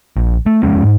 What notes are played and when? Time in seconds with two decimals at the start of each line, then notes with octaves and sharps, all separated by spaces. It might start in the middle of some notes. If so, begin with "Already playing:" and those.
0.17 A#1
0.46 A3
0.63 E1 F2 G#3 C#4
0.83 G#2